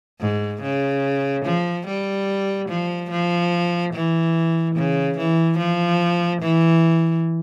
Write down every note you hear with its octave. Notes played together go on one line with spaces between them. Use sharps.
G#2
C#3
F3
G3
F3
F3
E3
C#3
E3
F3
E3